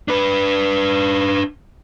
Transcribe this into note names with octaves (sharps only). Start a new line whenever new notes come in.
D4 B4